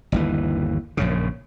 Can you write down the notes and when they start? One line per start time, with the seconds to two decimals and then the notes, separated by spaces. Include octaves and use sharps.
0.12 G1 D#2 E3
0.97 A#1 F#2 C#3